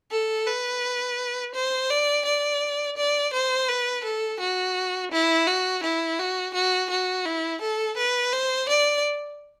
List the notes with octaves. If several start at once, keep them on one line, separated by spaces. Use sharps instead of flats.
A4
B4
C5
D5
D5
D5
C5
B4
A4
F#4
E4
F#4
E4
F#4
F#4
F#4
E4
A4
B4
C5
D5